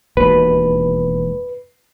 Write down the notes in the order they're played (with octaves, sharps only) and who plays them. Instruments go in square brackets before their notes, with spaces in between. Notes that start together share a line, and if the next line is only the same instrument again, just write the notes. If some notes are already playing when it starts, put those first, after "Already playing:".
[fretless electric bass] E1 D#2 B2 [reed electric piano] B4